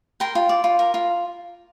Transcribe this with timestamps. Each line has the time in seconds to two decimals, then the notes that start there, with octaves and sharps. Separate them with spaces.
0.20 A#4 G5 C6
0.35 F4
0.49 D5
0.64 F4
0.79 A#4
0.94 F4